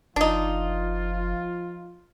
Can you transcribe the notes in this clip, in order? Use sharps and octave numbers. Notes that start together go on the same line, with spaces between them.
F#1 F3 D4 D#4 F4